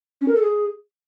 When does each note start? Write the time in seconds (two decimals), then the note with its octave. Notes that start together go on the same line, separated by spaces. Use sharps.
0.21 C#4
0.28 A#4
0.35 A4
0.42 G#4